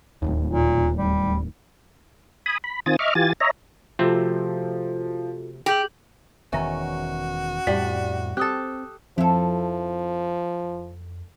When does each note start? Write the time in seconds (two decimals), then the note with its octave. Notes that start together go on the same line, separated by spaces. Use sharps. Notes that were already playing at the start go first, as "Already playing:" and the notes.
0.22 D1 G#1 D#2
0.52 A#2
0.98 G3
2.46 G#5 B5 D#6
2.64 B5
2.86 D#3 C4 F4 G#5 D#6 A6
2.99 D#5 E5 C#6 D6 F6
3.15 E3 F4 G4 G#5 A6
3.40 C#5 D#5 E5 A#5
3.99 C3 F3 A3 C4 F4 F#4 A4
5.66 G4 G#4 G6 F#7
6.53 E1 E2 D#3 C#4 F#4 E5 A#6
7.67 F2 A2 G3 G4 D5 B6
8.37 C4 G4 A4 D#6 F#6
9.18 F2 F3 E4 A4